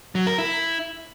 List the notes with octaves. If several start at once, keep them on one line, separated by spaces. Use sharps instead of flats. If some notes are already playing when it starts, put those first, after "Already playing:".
F#3
A#4
E4